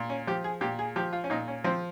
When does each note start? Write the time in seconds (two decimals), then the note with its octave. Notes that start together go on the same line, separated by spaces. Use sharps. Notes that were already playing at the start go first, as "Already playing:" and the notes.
Already playing: A#2
0.10 C#4
0.27 F3 G4
0.44 G#4
0.61 A#2 G4
0.79 G#4
0.96 F3 G4
1.13 F4
1.24 C#4
1.30 A#2 D#4
1.48 C#4
1.64 F3 C4